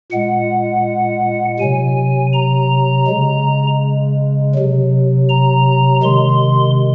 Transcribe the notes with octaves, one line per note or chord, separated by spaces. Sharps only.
A#2 G#3 F#5
C3 F#3 G#5
A#5
C#3 G#3
C3 F#3
A#5
C3 D#3 G#3 C6